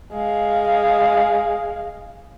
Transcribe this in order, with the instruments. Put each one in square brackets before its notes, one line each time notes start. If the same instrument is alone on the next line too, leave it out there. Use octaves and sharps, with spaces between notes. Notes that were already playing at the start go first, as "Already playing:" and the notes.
[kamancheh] G#3 F5